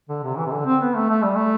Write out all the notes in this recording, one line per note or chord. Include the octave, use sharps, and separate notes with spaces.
D3
C3
E3
C3
D3
C4
B3
A3
A3
G3
A3